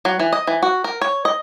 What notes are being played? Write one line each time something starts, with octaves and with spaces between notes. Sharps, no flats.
F#3
E3
D#5
E3
F#4
A#4
C#5
D#5